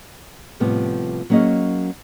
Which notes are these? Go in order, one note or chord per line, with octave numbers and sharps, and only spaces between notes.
A2 C3 F3 G3 B3
F#3 A#3 C#4 G#4 D#5